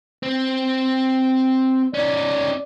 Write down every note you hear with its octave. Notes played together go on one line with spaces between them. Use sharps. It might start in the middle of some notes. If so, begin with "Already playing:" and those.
C4
C#4 D#4 D5